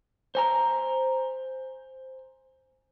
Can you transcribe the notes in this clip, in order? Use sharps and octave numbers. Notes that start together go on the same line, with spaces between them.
C5 G#5 A#5